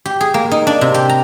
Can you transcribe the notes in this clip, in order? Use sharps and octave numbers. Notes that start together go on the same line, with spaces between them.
G4
G#4
A#3
D#4
D4
C3
G4
A#5